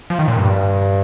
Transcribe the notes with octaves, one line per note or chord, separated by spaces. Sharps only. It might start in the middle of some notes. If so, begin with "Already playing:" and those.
F3
D#3
A#2
G2